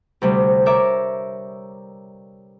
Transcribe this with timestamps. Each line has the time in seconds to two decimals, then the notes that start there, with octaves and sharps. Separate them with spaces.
0.22 D2 C3 G3 D5
0.66 A#4 C#5 D5 E5